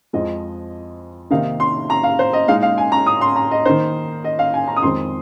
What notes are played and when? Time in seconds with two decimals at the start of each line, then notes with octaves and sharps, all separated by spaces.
0.13 F2 F3 G#3 D#5
1.30 C3 D#3 A#3 D#4 F5
1.60 C6
1.90 A#5
2.03 F5
2.19 C5
2.33 D#5
2.48 A#2 G#3 D#4 F5
2.63 F5
2.78 G#5
2.92 A#5
3.07 D#6
3.21 C6
3.36 A#5
3.51 D#5
3.65 D#3 A#3 D#4 C5
4.24 D#5
4.39 F5
4.54 G#5
4.68 A#5
4.76 D#6
4.83 F2 D#3 G#3 C4 C6